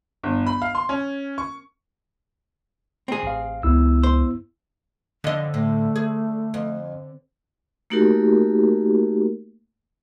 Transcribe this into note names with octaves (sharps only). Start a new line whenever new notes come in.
G1
B5
F5
C6
C#4
C#6
C4 G#4
A1 F5
C#2 B3 E4 E6
C5
F2 D3 D#5
A2 A3
G#4
F2
A3 A#3 D#4 F#4 G4 A#4